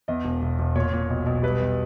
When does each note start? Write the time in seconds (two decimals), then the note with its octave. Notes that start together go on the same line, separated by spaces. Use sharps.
0.08 E2 D#5
0.25 E1
0.42 E1
0.59 E1
0.75 A#2 C#5
0.93 A#2
1.10 B1
1.26 B1
1.43 G3 B4
1.60 E2